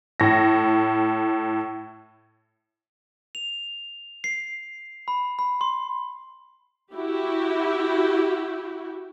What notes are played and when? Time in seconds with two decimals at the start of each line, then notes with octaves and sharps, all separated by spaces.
0.20 A2 A#6
3.35 F7
4.24 C7
5.08 B5
5.39 B5
5.61 C6
6.93 E4 F#4 G4